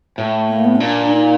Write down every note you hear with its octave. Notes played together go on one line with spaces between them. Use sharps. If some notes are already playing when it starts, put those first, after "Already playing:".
A2 A3
A#3
B3
C#4
A#2 D4
D#4